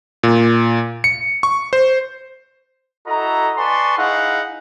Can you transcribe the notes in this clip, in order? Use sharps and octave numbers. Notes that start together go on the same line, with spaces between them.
A#2
C#7
C#6
C5
E4 F#4 A4 D#5 A#5
B4 D5 G#5 A5 C6 C#6
D#4 E4 G#4 F5 F#5